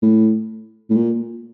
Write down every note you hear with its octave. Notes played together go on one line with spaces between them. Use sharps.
A2
A2
A#2